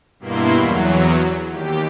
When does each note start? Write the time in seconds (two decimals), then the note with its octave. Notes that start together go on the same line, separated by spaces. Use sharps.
0.20 G2 B2 A#3 E4 C6
0.54 E2 F#3
1.49 D#2 G4